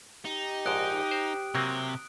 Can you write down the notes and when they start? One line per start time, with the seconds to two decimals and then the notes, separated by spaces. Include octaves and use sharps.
0.25 D#4 G4
0.66 A#1 G#2 D#6 F#6 D7
1.11 C5
1.55 C3 F#3 A#3 C4